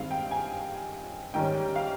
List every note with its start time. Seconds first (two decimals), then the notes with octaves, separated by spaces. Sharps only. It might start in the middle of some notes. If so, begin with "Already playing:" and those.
Already playing: G2 D#3 G#3 C4 F5
0.11 G5
0.31 G#5
1.34 G#2 D#3 G3 C#4 G5
1.76 F5